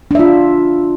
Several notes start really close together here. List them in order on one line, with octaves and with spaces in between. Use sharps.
D4 E5 F4